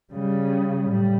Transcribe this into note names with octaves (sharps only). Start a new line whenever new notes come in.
C#3 G3
A2 G3